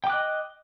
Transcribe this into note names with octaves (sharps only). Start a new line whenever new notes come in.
D#5 G5 D6 F#6